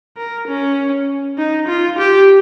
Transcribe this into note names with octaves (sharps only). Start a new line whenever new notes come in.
A#4
C#4
D#4
F4
G4